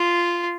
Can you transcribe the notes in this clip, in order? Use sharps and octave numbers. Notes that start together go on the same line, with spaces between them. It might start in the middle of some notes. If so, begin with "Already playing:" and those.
Already playing: F4